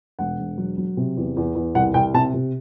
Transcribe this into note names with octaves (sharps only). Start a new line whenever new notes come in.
E1 F#5
E1
F#3
F#3
C3
E2
E2
E2
C2 F#5
C2 G5
C3 A5
C3